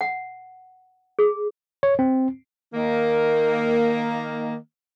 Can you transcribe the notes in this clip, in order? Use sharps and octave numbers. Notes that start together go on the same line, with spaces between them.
F#5
G#4
C#5
C4
D#3 A#3